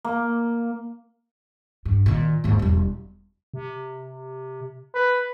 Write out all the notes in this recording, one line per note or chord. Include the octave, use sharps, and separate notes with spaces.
A#3
G2
A#2 D#3
D#2 G#2
E1 G3
C3
B4